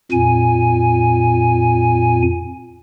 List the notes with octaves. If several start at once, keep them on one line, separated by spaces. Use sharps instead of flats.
F2 A#2 G#5